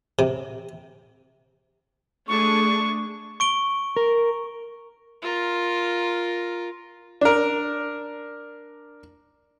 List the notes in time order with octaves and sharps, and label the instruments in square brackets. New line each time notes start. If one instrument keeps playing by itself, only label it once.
[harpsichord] C3
[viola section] A3 D4 G#4 [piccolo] C#6
[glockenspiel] C#6 D7 G7
[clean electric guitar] A#4
[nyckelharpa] F4 A#4
[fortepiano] D4 A#4